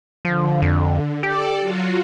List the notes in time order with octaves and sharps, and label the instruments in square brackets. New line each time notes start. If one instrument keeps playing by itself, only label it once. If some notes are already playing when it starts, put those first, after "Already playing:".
[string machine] D3 [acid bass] F3
[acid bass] F2
[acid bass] G4 [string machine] A4 D5
[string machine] F#3 F4 F#4